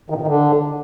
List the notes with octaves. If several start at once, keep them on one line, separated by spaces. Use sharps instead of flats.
D#3
A#2
D#3
D3